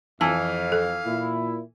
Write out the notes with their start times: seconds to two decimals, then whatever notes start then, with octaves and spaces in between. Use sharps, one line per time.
0.21 F2 E3 F5 A5
0.72 A4
1.06 A#2 E4